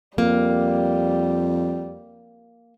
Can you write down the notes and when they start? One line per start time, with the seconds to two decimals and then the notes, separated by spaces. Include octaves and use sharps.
0.18 F2 G3 A#3